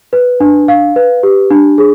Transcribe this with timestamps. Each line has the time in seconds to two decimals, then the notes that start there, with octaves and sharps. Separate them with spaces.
0.13 B4
0.40 D4
0.68 F5
0.96 B4
1.23 G4
1.51 D4
1.78 G#4